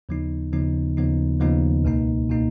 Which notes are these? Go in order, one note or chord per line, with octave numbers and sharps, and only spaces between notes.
D#2 C#3 F3 B3 D#4
D#2 C#3 F3 B3 D#4
D#2 C#3 F3 B3 D#4
D#2 C#3 F3 B3 D#4
C#2 B2 A#3 D#4
B2 A#3 D#4